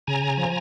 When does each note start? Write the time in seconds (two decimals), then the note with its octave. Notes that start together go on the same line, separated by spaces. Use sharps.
0.07 C#3 G#5 A#5
0.37 F3